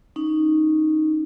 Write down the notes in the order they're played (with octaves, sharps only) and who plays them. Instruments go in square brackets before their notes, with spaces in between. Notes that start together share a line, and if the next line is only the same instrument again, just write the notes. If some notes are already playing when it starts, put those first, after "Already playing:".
[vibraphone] C#4 D#4